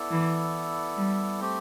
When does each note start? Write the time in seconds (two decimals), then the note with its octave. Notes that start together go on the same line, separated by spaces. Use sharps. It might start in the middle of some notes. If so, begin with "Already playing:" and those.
Already playing: B3 E4 A4 D5
0.11 E3
0.97 G3
1.41 A3 C4 G4